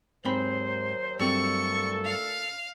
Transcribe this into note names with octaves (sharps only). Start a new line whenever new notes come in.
D#2 G#2 F#3 C4 C5 B5
G2 A#2 F#3 A3 C4 A4 C#6
F5